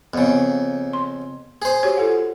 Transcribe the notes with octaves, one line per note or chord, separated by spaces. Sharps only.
F2 C#3 B3
C6
G#4 C5
F#4 G4 C#5
F4 A4 F#5